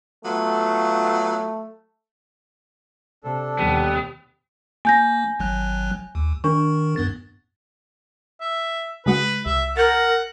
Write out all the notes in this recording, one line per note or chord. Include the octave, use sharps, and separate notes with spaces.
F#3 A3 B3 F4
C3 D4 A4
D#2 B2 G3 B3
A#3 G#5 G6 A#6
G#1 F#3 F#6
D#2
D#3 D4 A#4 C#6
G2 B3 A6
E5
C#3 G#3 F#4 B4
C2 E5
A#4 F#5 G6 A6